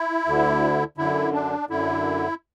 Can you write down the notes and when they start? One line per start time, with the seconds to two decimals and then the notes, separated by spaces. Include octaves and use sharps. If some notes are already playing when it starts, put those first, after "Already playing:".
Already playing: E4
0.26 D2 D3
0.97 F#2 D3 E4
1.33 D4
1.69 F#2 D3 E4